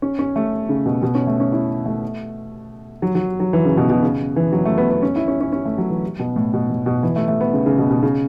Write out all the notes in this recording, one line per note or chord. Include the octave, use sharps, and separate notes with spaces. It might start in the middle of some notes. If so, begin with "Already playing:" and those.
C#4
C#4
A3
C#3
B2
B2
C#4
A3
C#4
E4
A3
F#3
F#3
F#3
E3
C#3
B2
B2
C#3
E3
F#3
A3
B3
B3
C#4
E4
C#4
C#4
C#4
A3
F#3
E3
B2
A2
B2
A2
B2
E3
A3
A3
B3
C#3
C#3
B2
B2
C#3